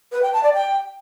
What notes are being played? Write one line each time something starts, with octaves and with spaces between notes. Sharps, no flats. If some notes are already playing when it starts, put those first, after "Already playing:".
B4
G5
A5
D5
G5